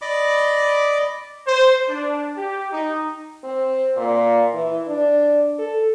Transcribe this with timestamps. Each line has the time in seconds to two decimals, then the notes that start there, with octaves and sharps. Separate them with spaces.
0.02 D5 D#5 B5 D6
1.47 C5
1.89 D4
2.36 G4
2.72 D#4
3.44 C4
3.97 A#2
4.54 E3
4.88 D4
5.59 A4